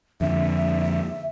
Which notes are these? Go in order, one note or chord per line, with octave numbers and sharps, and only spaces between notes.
F2 D3 E5